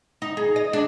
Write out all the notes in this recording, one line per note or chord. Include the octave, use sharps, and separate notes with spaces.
D#4
G#4
D#5
D4